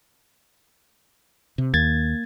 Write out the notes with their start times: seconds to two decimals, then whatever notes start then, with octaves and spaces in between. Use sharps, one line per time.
1.58 C3
1.74 D#2 A#3 G#6 A6